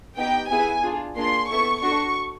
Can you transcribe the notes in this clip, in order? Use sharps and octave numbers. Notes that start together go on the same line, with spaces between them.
B3 D#4 G4 G5
B3 E4 G#4 G#5
D4 F4 G#4
A#3 D4 F4 G#4 C6
B3 E4 A4 C#6
D4 F#4 A4 C#6